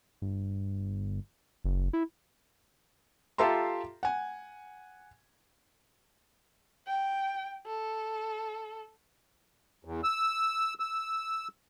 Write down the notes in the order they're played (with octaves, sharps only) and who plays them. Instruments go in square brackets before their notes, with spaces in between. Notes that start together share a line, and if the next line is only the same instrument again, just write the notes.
[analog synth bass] G1
F#1
E4
[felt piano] F4 G4 A4 E5 A#5 C6
F#5 G#5
[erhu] G5
A4
[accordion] E2
E6
E6